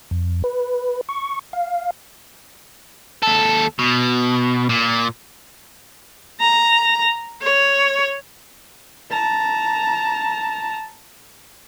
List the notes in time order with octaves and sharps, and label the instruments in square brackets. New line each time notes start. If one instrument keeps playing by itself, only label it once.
[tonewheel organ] F2
B4
C#6
F5
[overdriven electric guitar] D#2 A4
B2
A#2
[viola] A#5
C#5
[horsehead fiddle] A5 A#5